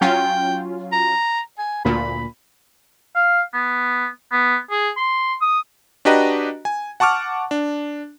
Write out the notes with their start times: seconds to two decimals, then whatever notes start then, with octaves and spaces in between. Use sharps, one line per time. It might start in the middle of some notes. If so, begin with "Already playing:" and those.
0.01 F#3 C#4 F4 G5
0.92 A#5
1.58 G#5
1.85 D2 A#2 B5
3.15 F5
3.54 B3
4.32 B3
4.71 G#4
4.97 C6
5.42 D#6
6.05 D4 F#4 G4 B4 D#5 A#5
6.65 G#5
7.00 F#5 A5 C#6 D6 F6
7.51 D4